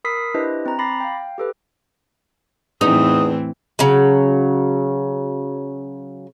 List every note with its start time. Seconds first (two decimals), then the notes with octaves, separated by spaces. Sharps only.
0.04 A#4 B5 D#6 E6 B6 C7
0.34 D4 E4 G4 B4 C5 D#5
0.66 C4 A#5
0.79 B5 D6 A6 A#6 C7
1.00 F5 G5
1.38 G4 A4 B4
2.81 E2 A2 E3 C4 D#4 D#6
3.79 C#3 F#3